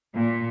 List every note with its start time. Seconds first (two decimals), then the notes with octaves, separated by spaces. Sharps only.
0.14 A#2